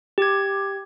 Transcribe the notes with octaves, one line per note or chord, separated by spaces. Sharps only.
G4 G#6